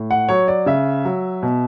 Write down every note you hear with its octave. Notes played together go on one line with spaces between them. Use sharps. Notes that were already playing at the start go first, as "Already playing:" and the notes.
Already playing: A2
F#5
F#3 C#5
D5
C#3 E5
F#3
B2